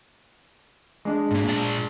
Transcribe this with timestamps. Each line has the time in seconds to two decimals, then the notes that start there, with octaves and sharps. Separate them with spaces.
1.05 G#3 D4 D#5
1.31 G#2 A#3
1.48 A#2 D5 A5